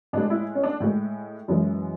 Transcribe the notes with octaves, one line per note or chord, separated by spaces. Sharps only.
A2 G#3 D4
E4
C#4
D4
A2 G#3
F#2 E3 G#3